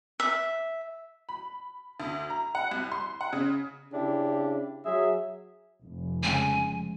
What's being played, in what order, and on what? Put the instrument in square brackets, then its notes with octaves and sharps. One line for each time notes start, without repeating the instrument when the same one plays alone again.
[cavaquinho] E5
[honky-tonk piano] B5
D2
A#5
F#5
C2
C6
F#5
C#3
[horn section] C#3 D4 E4 G4
F#3 G#4 E5
[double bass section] F1
[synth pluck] C#3 G#3 [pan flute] G#5